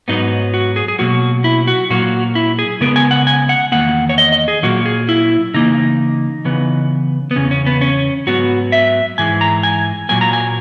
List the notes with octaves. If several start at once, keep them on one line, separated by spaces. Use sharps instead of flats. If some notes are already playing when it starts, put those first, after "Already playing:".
G#2 F#3 B3 D#4
F#4
G#4
G#4
B2 F#3 A#3 F#4
E4
F#4
A#2 F#3 A#3 F#4
E4
G#4
C#3 G#3 B3 A#4
G#5
F#5
G#5
F#5
E2 D#3 A#3 F#5
C#5
D#5
D#5
G#4
A#2 F#3 A#3 F#4
G#4
E4
C#3 E3 A#3 D#4
C#3 E3 B3
B3
E2 C#3 C#4
C#4
B3
C#4
G#2 F#3 B3 F#4
E5
G#2 E3 G#3 G#5
A#5
G#5
A#2 F#3 A#3 G#5
A#5
G#5